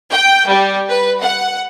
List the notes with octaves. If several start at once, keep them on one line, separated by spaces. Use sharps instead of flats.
G5
G3
B4
F#5